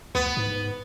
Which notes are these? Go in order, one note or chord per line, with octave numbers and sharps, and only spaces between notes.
D2 B3
G#2